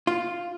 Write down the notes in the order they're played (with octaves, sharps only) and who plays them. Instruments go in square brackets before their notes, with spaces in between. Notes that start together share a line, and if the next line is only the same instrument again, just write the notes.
[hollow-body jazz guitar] F4